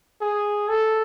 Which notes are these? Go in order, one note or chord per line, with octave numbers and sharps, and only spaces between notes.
G#4
A4